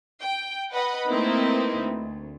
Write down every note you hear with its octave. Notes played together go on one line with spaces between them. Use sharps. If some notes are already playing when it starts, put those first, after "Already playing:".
G5
B4 D#5 F#5 B5
A3 A#3 C4 D#4 E4 B4
D2